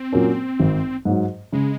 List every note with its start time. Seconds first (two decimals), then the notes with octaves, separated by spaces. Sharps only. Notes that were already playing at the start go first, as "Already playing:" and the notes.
Already playing: C4
0.13 A#2 F#3 A#3 C#4
0.60 G#1
1.05 G#2 F#3
1.53 C#3 G#3